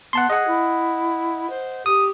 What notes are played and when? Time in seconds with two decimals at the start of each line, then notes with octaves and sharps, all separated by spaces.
0.13 B3 F#5 A5 C6
0.30 G#4 D#5 F#5
0.47 E4
1.50 C5
1.86 G4 D#6